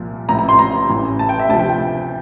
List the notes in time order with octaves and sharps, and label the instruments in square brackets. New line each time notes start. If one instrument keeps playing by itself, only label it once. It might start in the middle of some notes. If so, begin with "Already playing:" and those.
Already playing: [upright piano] C2 A#2 F3
A1 A2 F3 A#5
A#5
C6
A#5
A1 A2 E3
A5
G5
E5
D2 C3 F3 A5
G5
G5